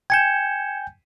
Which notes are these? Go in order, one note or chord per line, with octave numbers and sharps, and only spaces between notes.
G5 G#5 G6 G#6 C#7 E7